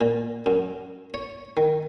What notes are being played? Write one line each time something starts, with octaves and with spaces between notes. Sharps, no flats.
A#2
F#2
C#5
D#3